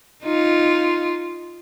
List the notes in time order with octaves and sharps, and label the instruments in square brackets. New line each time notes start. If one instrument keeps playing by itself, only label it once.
[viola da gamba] D#4 F4